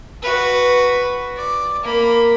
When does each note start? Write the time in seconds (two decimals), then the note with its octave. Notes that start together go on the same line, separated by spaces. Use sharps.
0.23 F#4 B4
1.37 D5
1.84 A#3 B5